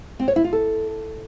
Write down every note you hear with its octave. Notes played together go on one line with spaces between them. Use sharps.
C4
C#5
E4
F4
A4